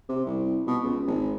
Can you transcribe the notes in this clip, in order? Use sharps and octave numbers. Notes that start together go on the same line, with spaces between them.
C3
C2
B2
C#2
G#1